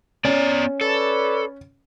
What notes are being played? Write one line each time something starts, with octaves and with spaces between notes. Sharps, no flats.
B3 C#4 D5
A4 B4 C#5 D5